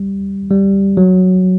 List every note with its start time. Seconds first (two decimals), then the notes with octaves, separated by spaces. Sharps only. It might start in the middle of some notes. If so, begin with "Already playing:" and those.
Already playing: G3
0.50 G3
0.97 F#3